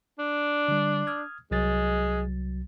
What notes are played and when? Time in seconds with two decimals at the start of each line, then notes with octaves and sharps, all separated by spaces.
0.19 D4
0.68 D3 G3
1.07 D#6 F6 G#6
1.51 C2 F#3 G#3 A6